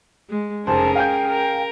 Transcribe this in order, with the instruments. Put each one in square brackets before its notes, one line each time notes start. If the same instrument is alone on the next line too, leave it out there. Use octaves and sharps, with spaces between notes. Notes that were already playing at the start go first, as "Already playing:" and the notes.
[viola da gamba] G#3
[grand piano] F1 C5 [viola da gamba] C#4 G#4 A#4 [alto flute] A5
[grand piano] F5 G#5 G6 [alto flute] G5
[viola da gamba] A#4